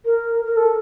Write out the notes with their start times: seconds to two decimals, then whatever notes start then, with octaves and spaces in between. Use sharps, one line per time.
0.05 A#4
0.45 A#4
0.57 A4